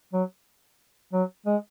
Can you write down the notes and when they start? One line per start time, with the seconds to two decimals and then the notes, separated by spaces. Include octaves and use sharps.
0.13 F#3
1.13 F#3
1.46 G#3